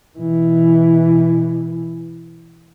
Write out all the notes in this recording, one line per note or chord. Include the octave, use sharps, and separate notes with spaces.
B2 E3